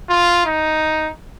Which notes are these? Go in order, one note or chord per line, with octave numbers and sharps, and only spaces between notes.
F4
D#4